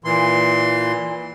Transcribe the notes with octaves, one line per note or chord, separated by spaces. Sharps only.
A#2 E3 C6